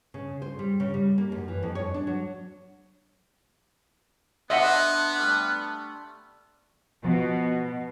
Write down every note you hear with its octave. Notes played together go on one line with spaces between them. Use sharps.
C#3
C5
G3
C#3
G3
A#3
F#2
E3
F2
C#5
D4
F#3
B3 D4 D#5 E5 F#5 C6 F#6
G3 A3
B2 F3